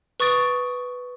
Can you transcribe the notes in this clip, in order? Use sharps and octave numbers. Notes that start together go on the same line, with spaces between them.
B4 C#6 D#6 A6 D7